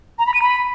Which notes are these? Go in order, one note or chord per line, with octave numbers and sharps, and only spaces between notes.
A#5
B5
D#7
B5